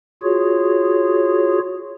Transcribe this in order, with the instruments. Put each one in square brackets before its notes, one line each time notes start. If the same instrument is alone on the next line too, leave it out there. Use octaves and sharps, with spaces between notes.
[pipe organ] F4 F#4 G#4 C#5